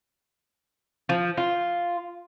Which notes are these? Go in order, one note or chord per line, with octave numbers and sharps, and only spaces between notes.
F3
F4